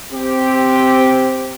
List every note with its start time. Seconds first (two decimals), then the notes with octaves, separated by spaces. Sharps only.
0.12 C4 G4